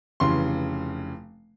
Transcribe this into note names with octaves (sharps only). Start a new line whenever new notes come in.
F1 C#3 E3 C6